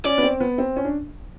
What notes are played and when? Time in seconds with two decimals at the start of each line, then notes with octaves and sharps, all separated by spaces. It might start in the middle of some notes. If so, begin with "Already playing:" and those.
0.05 C#4 D5
0.18 B3
0.23 C4
0.40 B3
0.58 C4
0.76 C#4
0.85 D4